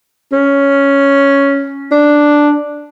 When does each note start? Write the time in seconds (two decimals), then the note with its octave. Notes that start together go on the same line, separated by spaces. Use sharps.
0.33 C#4
1.91 D4